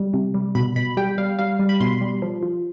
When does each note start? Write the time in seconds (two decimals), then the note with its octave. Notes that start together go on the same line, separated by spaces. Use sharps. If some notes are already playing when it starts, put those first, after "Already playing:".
Already playing: G3
0.14 C3
0.34 G3
0.55 B2 B5
0.76 B2 B5
0.97 G3 G5
1.18 G3 F5
1.39 G3 F5
1.59 G3
1.69 B5
1.80 B2 C6
2.01 G3
2.22 F3
2.43 F3